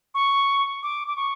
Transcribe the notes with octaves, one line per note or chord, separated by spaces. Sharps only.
C#6
D6
D6
C#6